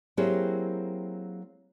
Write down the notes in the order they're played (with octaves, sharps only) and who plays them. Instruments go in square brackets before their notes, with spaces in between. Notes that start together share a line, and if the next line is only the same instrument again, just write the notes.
[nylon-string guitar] F#3 A#3 C4 E4 G4 G#4